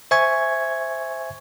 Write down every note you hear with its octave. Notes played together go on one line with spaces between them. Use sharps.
C5 E5 G#5 C#6 G#6